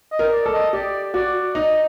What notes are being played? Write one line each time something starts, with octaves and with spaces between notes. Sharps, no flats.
D#5
A#4
D5
A4
D#5
G4 D5
F#4 D5
D#4 D#5